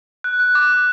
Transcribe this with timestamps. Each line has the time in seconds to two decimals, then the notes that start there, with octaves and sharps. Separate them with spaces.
0.24 F#6
0.40 F#6
0.55 D6
0.70 D6